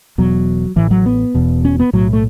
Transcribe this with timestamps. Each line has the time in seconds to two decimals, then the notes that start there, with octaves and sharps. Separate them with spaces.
0.18 E1 E2 B2 F#3
0.76 A1 A2 E3
0.91 F#3
1.06 B3
1.35 E1 E2 B2
1.65 C#4
1.80 B3
1.93 B1 A2 F#3
2.13 A3